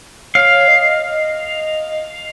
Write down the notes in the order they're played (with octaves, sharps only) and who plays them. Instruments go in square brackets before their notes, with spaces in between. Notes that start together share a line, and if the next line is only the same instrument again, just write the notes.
[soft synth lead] C#5 [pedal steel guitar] F5
[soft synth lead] D#5